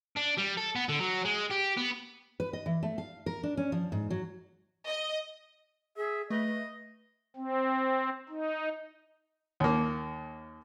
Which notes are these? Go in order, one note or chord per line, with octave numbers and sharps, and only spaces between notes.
D4
G3
A4
B3
D3
F#3
G#3
G4
B3
B4
D#5
E3
A3
F5
A#4
D4
C#4
F3
G#2
F#3
D#5
G#4 E5
A3 B4 D#5
C4
D#4
D#2 A#3